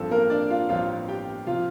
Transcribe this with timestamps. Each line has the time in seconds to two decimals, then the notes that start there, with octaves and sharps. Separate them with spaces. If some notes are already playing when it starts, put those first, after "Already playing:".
Already playing: A1 G2 F3 C4 A4
0.11 A#3 A#4
0.30 D4 D5
0.50 F4 F5
0.69 A1 G2 F3 C4 F4 F5
1.08 G4 G5
1.47 C3 F3 F4 F5